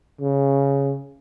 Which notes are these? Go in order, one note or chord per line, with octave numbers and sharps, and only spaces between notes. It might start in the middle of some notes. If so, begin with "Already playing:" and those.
C#3